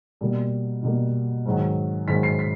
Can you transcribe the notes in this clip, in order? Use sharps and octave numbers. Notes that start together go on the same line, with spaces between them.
B2 G3 A#3
B2 G3 A#3
G#2 D#3 F#3
G#2 D#3 F#3 B6
C7
B6